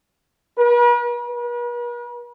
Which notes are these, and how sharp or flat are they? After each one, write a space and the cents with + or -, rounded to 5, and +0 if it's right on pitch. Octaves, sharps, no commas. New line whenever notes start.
B4 -45
B4 -45